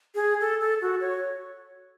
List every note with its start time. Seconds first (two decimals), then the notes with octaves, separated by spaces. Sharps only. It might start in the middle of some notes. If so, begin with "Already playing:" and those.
0.15 G#4
0.41 A4
0.61 A4
0.82 F#4
1.01 C#5